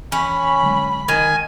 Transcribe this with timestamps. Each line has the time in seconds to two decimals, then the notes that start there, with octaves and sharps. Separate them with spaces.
0.12 E3 C#4 B5
0.63 D3 F#3 G#3
1.08 D#3 G#5